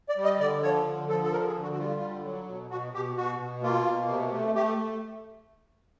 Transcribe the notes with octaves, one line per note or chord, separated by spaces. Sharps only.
D5
G3
D#5
D3 D5
F3 C#5
D3
F3 A4
A4
D3 A#4
G#4
D3
F#4
F#4
G3 F4
D3
F#3
B2
B2 F#4
B2 G4
B2 F#4
B2
A#3 F4
B2
C3
A3
A3 G4
A3